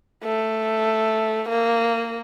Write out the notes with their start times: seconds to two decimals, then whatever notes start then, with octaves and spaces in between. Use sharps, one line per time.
0.24 A3
1.49 A#3